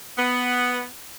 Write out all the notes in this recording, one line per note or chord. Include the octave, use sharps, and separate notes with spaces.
B3